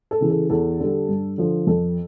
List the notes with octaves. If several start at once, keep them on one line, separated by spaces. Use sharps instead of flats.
A4
C#3 E3
A4
E2 A4
D3 G3
G2
D3 F3
F2 A4